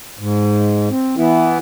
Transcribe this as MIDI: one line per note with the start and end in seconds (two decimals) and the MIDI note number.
0.19 0.89 44
0.90 1.15 60
1.17 1.58 52
1.17 1.58 59
1.17 1.58 64